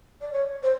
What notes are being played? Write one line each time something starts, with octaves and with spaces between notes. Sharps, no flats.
D5
C#5
C5